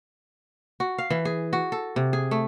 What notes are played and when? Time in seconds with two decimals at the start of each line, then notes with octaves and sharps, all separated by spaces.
0.80 F#4
0.98 F5
1.10 E3
1.25 G#4
1.53 F#4
1.72 A4
1.96 C3
2.13 G#4
2.31 A3